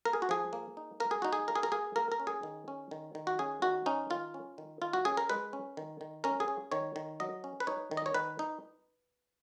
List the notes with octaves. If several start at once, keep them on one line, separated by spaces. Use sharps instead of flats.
A#3 A#4
G#4
F#4
F3 G#4
A#3
D#4
A#3 A#4
G#4
D#4 F#4
G#4
A#3 A#4
G#4
A#4
A#3 G#4
A#3 A#4
A#4
C#4
G#4
D#3
C#4
D#3
D#3
F#4
C#4 G#4
D#3 F#4
C#4 D#4
D#3 F4
C#4
D#3
D#3 F4
F#4
C#4 G#4
A#4
G#3 B4
C#4
D#3
D#3
C#4 A#4
G#4
C#4
D#3 C#5
D#3
F#3 D#5
C#4
B4
D#4 C#5
D#3
D#5
C#5
D#3 B4
D#4